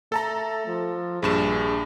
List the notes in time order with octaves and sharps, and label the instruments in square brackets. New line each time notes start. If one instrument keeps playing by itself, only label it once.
[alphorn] A3 [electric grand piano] A4 A5 A#5
[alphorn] F3
[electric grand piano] A#1 G2 E7 [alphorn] G#4